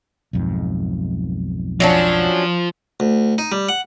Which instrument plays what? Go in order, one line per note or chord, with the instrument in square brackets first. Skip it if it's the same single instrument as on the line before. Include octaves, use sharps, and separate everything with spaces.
[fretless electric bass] B1 F2 G#2
[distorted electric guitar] F3 [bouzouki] F#3 C#4 D4
[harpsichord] D2
D#4
G3
F#5